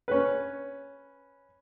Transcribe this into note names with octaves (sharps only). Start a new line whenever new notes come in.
C#4 B4